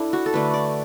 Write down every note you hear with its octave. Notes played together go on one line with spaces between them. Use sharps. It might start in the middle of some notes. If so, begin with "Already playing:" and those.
Already playing: D4 E4 A4
F#4
A4
D3 A3 D4 B4
D5